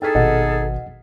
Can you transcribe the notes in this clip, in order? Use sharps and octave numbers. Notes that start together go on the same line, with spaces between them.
D#4 G#4 A4 G5 F6 B6
G#1 B2 D#5 F#5